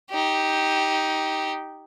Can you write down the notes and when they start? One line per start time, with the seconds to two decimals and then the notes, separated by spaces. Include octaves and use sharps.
0.11 D#4 G4